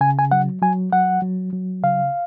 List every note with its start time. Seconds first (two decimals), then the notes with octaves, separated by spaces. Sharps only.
0.01 C#3 G#5
0.19 G#5
0.32 F#3 F#5
0.62 F#3 G#5
0.92 F#3 F#5
1.22 F#3
1.53 F#3
1.83 C#3 F5